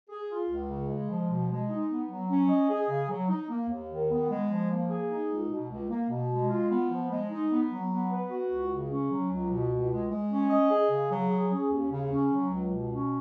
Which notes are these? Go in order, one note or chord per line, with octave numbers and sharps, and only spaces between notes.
G#4
F4
C#2
C#3
G#3
F3
B2
G#3
D#4
B3
F#3
C#4
D#5
G#4
C#3
F#3
D#4
A#3
D#2
D#3
B3
G#3
F3
A#3
G#4
D#4
C#2
B2
C#2
A#3
B2
G#3
F4
B3
F3
G#3
D#4
B3
F#3
B3
B4
F#4
C#2
C#3
C#4
F#3
C#2
B2
C#2
G#3
G#3
C#4
D#5
G#4
C#3
F#3
G#4
C#4
D#2
C#3
C#4
F#3
C#2
B2
C#4